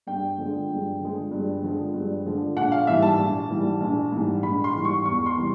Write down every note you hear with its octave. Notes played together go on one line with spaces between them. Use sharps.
G2 G5
D3 F3 G#3
G2
D3 F3 G#3
G2
D3 F3 G#3
G2
D3 F3 G#3
A#1 F#5
F5
G#2 E3 G3 E5
A5
A#1
G#2 E3 G3
A#1
G#2 E3 G3
A#1 B5
C6
G#2 E3 G3
C#6
E2 C#6
C6
C3 E3 G3